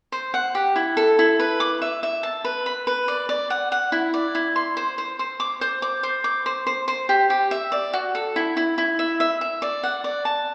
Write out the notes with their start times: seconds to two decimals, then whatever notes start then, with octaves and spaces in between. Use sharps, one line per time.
0.12 C5
0.34 F#5
0.55 G4
0.76 E4
0.97 A4
1.19 E4
1.40 B4
1.60 D6
1.82 E5
2.03 E5
2.23 A5
2.45 B4
2.66 B5
2.87 B4
3.08 D5
3.29 D5
3.50 F#5
3.72 F#5
3.92 E4
4.14 D5
4.35 E4
4.56 C6
4.77 C5
4.98 C5
5.19 C5
5.40 D6
5.61 C5
5.82 D6
6.03 C5
6.24 D6
6.46 C5
6.67 C5
6.88 C5
7.09 G4
7.30 G4
7.51 E5
7.72 D5
7.93 F#4
8.15 A4
8.36 E4
8.57 E4
8.78 E4
8.99 E5
9.20 E5
9.41 E5
9.62 D5
9.83 F#5
10.04 D5
10.25 A5